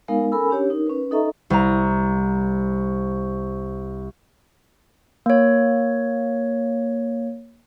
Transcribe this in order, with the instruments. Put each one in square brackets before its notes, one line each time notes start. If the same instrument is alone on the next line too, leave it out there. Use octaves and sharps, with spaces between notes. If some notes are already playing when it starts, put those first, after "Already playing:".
[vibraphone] G#3 B3 D#4 A#4 F5
C#4 A4 A#4 G#5 B5 E6
C#4 D4 G4 C#5
D#4 A#4
C#4 B4
D#4 A4 D#5 E5 A#5 C#6
[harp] C2 A#5
[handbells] A#3 C#5